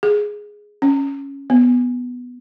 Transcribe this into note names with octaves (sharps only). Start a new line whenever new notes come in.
G#4
C#4
B3